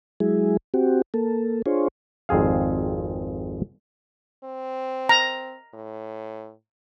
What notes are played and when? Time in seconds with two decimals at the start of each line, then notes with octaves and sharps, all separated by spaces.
0.20 F#3 G#3 E4 G#4
0.74 C4 F#4 G4
1.14 A#3 A4
1.66 D4 F4 G#4 C5 C#5
2.29 G#1 F2 C4 G#4 F5
4.44 C4
5.09 A#5
5.74 A2